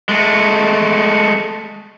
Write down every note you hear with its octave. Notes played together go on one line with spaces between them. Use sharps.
G#3 A3